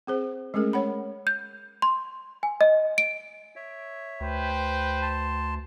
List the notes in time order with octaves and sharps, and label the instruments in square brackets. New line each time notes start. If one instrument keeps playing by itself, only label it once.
[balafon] C4 G#4 C5
G#3 A3 C#4 G#4 A#4
C#5 F#5 B5
[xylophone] G6
C6
G#5
D#5
D7
[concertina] C#5 E5
[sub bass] D2 [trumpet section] B4 C5 G5
[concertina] A5 C6